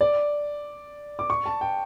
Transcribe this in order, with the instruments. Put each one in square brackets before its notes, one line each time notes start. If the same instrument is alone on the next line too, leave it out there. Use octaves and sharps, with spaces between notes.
[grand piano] D5
D6
C#6
A5
G5